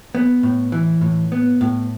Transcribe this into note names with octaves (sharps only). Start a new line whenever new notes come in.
B3
A2
E3
A2
B3
A2